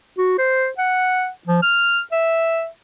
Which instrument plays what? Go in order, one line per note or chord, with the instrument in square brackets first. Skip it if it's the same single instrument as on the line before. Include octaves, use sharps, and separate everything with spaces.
[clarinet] F#4
C5
F#5
F3
F6
E5